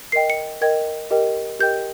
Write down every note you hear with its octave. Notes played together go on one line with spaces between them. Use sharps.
A#4 D#5 G5 C7
C#7
A#4 D#5 G5 G#6
G4 A#4 D#5 G5
G4 A#4 D#5 G5 G6